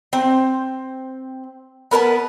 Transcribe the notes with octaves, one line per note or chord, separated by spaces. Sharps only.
C4 G5
B3 A#4 B4 A5